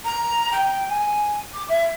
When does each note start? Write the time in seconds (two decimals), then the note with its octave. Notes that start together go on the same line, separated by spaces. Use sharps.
0.05 A#5
0.52 G5
0.89 G#5
1.54 D6
1.69 E5